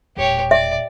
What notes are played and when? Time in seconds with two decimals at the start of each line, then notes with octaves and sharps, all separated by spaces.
0.17 E1 A#2 G4 C#5
0.51 D5 E5